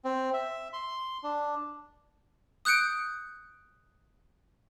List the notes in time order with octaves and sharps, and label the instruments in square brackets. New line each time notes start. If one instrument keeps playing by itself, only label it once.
[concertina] C4
E5
C6
D4
[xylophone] D#6 F#6 G6 C#7 D7